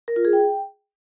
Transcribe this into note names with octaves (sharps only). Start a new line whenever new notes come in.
A#4
F4
G#4
G5